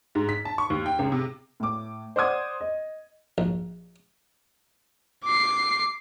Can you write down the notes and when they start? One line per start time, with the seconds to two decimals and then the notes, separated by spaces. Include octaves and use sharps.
0.15 G#2
0.29 B6
0.45 A5
0.58 C#6
0.70 D#2
0.86 G5
0.99 C#2
1.12 C3
1.60 A2 D6
2.16 C5 D5 F#5 D6 D#6 G#6
2.61 D#5
3.38 A#1
5.24 D6 C7